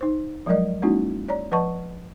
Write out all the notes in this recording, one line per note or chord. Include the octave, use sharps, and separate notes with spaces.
D#4 C5
F3 F#3 G#3 A#4 D5 D#5
G#3 A#3 C#4 D#4 E4 F#4
C#5 D5 A#5
F3 B4 D#5 F#5 A5 C#6